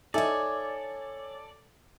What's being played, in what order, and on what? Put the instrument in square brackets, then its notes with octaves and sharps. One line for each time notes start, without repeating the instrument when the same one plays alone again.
[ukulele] D#4 E5 [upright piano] A4 [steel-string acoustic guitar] C#5 G#5 [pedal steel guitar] D5